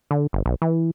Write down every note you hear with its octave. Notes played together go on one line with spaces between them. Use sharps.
D3
G1
B1
E3